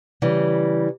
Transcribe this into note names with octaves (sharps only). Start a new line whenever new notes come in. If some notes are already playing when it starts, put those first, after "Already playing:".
C#3 E3 G3